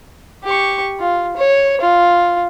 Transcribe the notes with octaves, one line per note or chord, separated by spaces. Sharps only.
G4 C#6
F4
C#5
F4